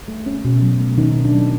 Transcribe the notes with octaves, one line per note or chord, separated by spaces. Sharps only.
A3
C#4
B2
F#3
A3
D#3 C#4 D#4
B2
D4
F#3